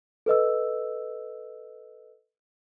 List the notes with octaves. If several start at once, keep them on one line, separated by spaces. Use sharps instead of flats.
A4 B4 D#5 E6